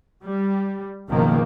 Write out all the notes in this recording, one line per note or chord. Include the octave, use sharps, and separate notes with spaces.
G3
F#1 B2 D#3 F3 A#3